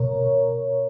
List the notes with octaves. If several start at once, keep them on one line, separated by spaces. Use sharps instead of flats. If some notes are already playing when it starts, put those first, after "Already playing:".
Already playing: B2 A#4 C#5